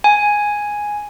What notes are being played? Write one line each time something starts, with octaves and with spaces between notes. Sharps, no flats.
G#5